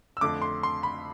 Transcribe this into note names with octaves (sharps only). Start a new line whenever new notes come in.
E6
F2 D3 A3 D6
C6
C6
B5